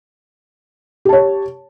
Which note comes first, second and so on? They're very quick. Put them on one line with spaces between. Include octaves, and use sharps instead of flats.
G4 A5 C#5